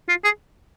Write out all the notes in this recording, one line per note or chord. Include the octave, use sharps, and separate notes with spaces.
F4
G#4